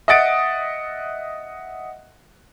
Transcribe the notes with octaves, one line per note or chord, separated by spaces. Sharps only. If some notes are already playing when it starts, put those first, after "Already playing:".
D#5 E5 F#5 D#6 A6 D7